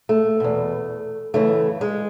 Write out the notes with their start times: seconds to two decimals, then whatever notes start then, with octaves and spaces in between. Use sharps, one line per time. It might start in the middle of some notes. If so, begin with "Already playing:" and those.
0.09 A3
0.40 E2 B2
1.34 F#2 C#3 E3 A3
1.81 G#3